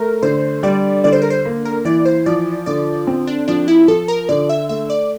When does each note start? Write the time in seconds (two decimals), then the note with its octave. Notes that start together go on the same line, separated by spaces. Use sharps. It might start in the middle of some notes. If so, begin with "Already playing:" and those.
Already playing: A3 A#4
0.23 D3 C5
0.63 G3 D5
1.04 D3 D5
1.13 C5
1.22 A#4
1.30 C5
1.45 A#3
1.65 A#4
1.85 E3 D5
2.05 C5
2.26 F3 D5
2.66 D3 D5
3.07 C4
3.27 D4
3.48 F3 D4
3.68 E4
3.88 F3 A4
4.08 A#4
4.29 D3 D5
4.49 E5
4.69 A3 E5
4.90 D5